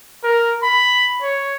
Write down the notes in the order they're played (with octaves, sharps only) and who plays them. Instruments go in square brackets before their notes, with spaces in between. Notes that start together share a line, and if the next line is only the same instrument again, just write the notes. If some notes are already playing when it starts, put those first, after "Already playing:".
[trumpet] A#4
B5
C#5